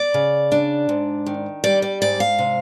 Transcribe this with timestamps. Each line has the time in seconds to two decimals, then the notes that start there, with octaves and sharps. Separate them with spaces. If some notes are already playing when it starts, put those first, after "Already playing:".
Already playing: D5
0.14 C#3
0.52 D4
0.89 G#2
1.26 D#3
1.64 G3 D5
1.82 D5
2.02 G#2 D5
2.20 F5
2.39 C3